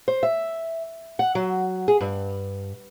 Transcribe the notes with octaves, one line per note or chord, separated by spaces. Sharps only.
C5
E5
F#5
F#3
G#4
G2